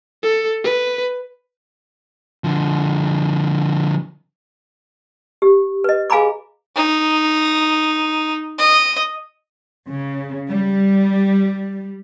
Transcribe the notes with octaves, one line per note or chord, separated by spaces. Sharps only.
A4
B4
D3 F3
G4
B4 D#5
G#4 F5 G#5 A#5 B5 D6
D#4
D#5
C#3
G3